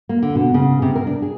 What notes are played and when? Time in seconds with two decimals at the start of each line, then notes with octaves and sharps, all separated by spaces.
0.09 A#3
0.23 D3
0.35 B2
0.54 C#3
0.82 C3
0.95 A#4
1.07 D4
1.22 G#4